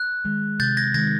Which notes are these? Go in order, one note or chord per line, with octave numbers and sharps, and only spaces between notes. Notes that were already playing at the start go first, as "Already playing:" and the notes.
Already playing: F#6
D#3 G#3
C3 G6 A6
G#6 A#6
D#3 G#3 G#6 A#6